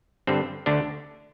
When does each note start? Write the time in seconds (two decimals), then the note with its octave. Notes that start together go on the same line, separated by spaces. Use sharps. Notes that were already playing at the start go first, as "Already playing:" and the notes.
0.27 G2 D3 C4
0.66 D2 D3 D4